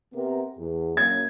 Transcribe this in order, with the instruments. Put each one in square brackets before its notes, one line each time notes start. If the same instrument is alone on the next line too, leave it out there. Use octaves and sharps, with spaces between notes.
[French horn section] C3 B3 A#4
E2
[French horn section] F#2 A#3 [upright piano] G#6